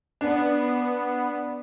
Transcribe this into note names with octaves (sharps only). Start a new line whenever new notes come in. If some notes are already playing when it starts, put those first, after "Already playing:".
B3 D4